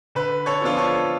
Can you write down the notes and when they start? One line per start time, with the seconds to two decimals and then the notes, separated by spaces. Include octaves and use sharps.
0.15 D3 B4
0.46 A4 C#5
0.62 F3 B3 D4 F4
0.77 A4 C#5